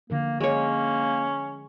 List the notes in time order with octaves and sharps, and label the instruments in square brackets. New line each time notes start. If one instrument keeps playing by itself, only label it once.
[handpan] D3 F3 A#4 [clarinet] A#3
[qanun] G#3 C#5 [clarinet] A#3 [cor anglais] C#4